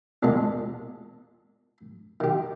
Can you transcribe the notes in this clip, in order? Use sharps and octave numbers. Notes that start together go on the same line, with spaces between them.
A#1 E2 A#2 G#3 D#5 A5
D#3 G4